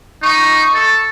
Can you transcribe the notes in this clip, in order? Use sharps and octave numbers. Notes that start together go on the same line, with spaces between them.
D#4 C#6
A4